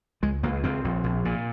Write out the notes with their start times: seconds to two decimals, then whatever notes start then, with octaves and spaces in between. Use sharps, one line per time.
0.23 C#2 G#3
0.43 C#2 A#3
0.64 C#2 C4
0.84 A#1
1.04 A#1
1.25 A#2